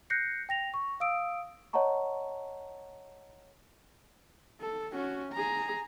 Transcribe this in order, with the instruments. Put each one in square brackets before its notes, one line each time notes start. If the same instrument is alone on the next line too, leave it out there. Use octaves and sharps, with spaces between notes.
[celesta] F#6 G6 A#6 C7 C#7
G5 A#6 F7
C#6
F5 D#6 E6 D7
C#5 D#5 F#5 A5 A#5 C#6
[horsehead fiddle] A4
C#4 F#4
G#4 A#5